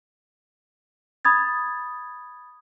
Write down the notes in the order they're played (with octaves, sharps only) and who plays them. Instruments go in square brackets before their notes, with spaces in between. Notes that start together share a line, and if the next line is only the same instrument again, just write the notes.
[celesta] B5 D#6 G#6 A6